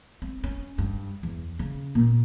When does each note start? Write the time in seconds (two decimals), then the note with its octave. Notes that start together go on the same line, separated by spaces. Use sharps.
0.22 C4
0.44 C#4
0.78 G2
1.23 E2
1.59 C#3
1.95 A#2